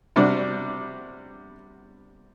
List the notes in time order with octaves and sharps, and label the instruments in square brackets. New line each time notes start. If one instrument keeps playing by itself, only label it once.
[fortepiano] C3 G3 D4 F#4